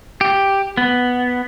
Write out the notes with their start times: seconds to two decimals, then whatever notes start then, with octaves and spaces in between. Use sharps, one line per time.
0.21 G4
0.77 B3